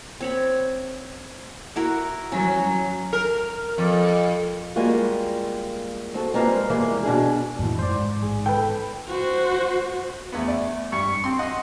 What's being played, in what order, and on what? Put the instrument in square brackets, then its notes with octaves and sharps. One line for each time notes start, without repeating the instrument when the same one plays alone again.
[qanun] C4 C#5 B5
E4 F#4 A#4
[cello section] F#3 [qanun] C#4
[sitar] A#4
F2
[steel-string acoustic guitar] G3 G#3 A#3 F4 F#4
C4 F#4 A4
G3 G#3 A#3 C4 F4 B4
E3 G3 G#3 A#3
B2 D4 G#4
[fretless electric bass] F#2 A2 E3
[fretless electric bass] G#2 [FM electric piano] C5 D5
[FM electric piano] A1 G#4
[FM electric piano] A4 [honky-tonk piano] B4 G5
[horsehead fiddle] F#4 C5
[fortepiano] E2 B3 [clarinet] A3
[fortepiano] D5
[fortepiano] G2 [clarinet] C#6
[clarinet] C4 [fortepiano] C6
[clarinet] D#5 [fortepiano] F#5 C6